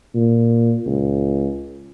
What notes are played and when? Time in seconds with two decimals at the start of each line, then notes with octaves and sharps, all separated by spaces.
0.15 A#2
0.86 C#2